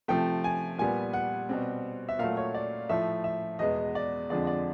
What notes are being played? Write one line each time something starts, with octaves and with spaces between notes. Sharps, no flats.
C3 F3 A3 G5
G#5
A#2 G3 B3 G#5
F#5
B2 G3 C4
E5
A#2 F#3 A3 F5
C#5
D5
A2 F3 A3 E5
E5
E2 B2 G#3 B3 D#5
D5
F2 D3 F3 G#3 D5
D5